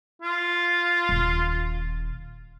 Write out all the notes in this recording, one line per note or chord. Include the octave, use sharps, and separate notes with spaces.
F4
D#1